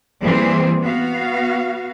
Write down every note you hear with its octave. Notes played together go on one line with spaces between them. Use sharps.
E3 G3 A#3 C4 G#4
B3 F#4 F5